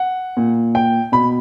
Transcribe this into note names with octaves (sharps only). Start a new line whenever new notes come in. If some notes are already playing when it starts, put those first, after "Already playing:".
Already playing: F#5
A#2
G5
B2 B5